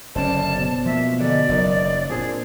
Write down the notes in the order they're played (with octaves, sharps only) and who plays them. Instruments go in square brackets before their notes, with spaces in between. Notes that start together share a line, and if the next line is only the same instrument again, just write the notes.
[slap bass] F#1 D3 C#4 [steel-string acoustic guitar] C5 D5 [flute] A5
[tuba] B2
[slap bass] F3 A#3 [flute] E5
[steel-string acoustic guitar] F2 G#2 G#3 [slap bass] D3 [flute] D5
[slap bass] F#1 F#3 [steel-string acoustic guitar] F2 D#3 D#4
[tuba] A#2 [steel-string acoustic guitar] F3 C4 D4 [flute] G#4